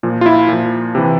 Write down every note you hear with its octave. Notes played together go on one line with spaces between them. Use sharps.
A#2 F3
F4
E4
A#2 F3
C3 E3